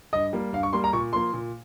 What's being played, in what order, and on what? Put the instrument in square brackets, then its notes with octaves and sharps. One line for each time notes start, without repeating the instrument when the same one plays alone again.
[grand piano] G2 D#5
G3 A#3
G2 F5
C#6
G3 A#3 C6
A#5
A#2 C#6
F3 A#3 C6
A#2